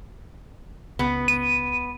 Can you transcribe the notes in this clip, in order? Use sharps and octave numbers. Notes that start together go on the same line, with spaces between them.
C#2 B3
D#7